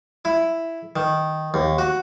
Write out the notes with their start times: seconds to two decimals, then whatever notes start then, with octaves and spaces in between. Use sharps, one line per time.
0.25 E4
0.96 D#3
1.54 D#2
1.79 F#4